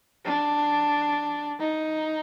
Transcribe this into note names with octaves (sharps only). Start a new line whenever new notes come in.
D4
D#4